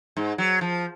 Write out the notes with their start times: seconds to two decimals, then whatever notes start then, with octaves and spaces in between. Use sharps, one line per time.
0.17 G#2
0.38 F#3
0.61 F3